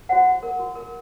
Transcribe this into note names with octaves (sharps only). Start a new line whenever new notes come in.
F#4 C5 F#5
F#4
A#4
F#4
A#4